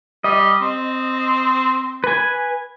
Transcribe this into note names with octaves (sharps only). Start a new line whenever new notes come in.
G3 D#5
C4
B4 G#5